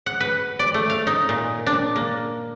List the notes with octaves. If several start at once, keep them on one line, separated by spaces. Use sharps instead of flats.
F#5
B4
D5
A3
F5
D#4
A#2
D4
A#3